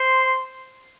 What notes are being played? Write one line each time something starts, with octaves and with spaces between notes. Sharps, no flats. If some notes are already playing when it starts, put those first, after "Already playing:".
Already playing: C5 C6